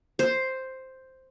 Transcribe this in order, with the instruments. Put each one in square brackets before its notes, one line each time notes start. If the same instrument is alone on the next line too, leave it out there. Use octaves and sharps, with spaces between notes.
[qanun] C5